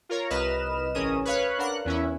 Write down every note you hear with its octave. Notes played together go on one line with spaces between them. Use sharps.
F4 A#4 C#5 A#5
C2 B4 D#5 F6 E7
A1 C#4 G#4 A#4 D#6
B4 C#5 F5 F#6
D4 A#4 F#5 F#6
E2 C#4 E4